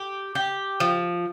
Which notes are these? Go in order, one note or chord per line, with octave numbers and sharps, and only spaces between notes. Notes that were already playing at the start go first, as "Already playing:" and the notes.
Already playing: G4
G4
F3